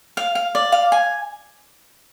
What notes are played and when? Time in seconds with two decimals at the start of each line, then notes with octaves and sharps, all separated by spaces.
0.17 F5
0.35 F5
0.55 D5
0.72 F5
0.92 G#5